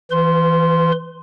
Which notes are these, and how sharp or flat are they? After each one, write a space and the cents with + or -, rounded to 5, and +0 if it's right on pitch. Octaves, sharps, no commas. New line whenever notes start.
E3 +0 B4 +40 C6 +0